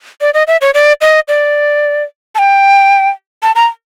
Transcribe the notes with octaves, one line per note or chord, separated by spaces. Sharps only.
D5
D#5
E5
C#5
D5
D#5
D5
A5
G5
A5
A#5